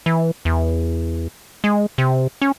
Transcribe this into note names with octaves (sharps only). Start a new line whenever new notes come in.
E3
E2
G#3
C3
C#4